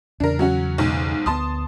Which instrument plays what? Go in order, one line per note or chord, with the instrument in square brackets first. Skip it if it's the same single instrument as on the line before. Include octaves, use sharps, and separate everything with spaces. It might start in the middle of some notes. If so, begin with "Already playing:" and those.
[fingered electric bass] E2 C#3 [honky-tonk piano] D4 A#4
[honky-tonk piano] F#3 C#4 F#4
B1 G#2
[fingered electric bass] D2 G3 B3 [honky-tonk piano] A5 C6 D#6